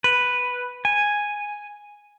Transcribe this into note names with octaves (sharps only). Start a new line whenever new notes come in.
B4
G#5